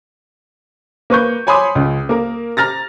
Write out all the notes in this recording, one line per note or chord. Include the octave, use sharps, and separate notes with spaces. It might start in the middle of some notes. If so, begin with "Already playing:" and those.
A#3 B4 C#6 G6
C#5 G#5 B5 C6 D6 D#6
C#2
A#3 A#4
A#5 F6 A6 A#6